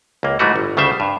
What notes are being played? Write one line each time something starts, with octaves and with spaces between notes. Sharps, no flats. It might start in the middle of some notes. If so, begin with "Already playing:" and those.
C#2 A#3
G#2 E3 G3 A3 F#4
G1
D2 C#3 G3 C5 E5
G2